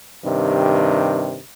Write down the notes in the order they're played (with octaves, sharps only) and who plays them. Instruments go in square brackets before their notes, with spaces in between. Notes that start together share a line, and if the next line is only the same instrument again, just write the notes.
[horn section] G2 C3 D#3